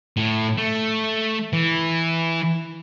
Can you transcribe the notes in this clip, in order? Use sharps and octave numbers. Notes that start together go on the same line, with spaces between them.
A2
A3
E3